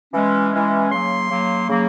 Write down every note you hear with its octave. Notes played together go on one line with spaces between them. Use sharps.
E3 G#3 C#4
E3 G#3 C#4
C#3 F#3 A#3 C6
C#3 F#3 A#3
C#3 F#3 A#3